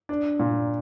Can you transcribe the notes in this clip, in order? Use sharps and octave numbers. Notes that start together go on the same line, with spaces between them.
D4
A#2